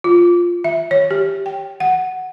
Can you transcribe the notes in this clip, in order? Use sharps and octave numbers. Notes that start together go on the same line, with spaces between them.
F4
E5
C#5
G4
G5
F#5